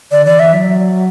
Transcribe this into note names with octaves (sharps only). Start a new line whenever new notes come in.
D3 D5
E3 D5
E3 E5
F#3